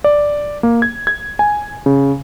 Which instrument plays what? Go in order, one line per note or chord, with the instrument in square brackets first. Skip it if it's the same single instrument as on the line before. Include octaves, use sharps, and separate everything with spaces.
[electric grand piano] D5
A#3
G#6
G#6
G#5
C#3